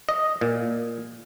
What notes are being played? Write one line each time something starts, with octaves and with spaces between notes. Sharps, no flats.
D#5
A#2